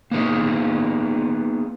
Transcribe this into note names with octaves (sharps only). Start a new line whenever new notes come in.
A#3 B3 D#4 G#4